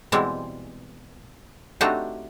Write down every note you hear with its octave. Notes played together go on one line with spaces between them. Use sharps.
B2 E3 G3 G#3 C4
A3 C4 D4 D#4 F#4 G4